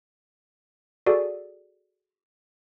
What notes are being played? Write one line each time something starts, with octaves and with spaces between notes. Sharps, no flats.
F#4 G#4 A4 D5